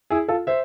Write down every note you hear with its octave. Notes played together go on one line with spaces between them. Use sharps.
E4 G#4
F4 A4
C5 E5